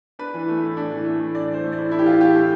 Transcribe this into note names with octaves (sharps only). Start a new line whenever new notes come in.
D4 B4
E3
A3
A2
D4
E3
A3
A2
D4 D5
E3 C5
A3
D5
A2
D4 E4
G4
E3 F4
A3 G4
A2 G4